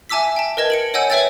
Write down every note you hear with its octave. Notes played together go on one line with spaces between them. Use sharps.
E5 G#5 A5 D6 E6 B6
G5 A5
A#4 B4 D#5 A5 G#6
C#7 D7 F#7
C#5 D#5 F#5 G#5 E6 G6
B4 C#5 E5 G5 E6 A6